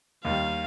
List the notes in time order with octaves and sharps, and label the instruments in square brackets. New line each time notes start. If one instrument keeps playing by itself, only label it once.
[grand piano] D#2 D#3 G3 [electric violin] F5